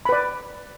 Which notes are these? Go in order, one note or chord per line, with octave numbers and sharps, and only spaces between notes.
B4 D5 B5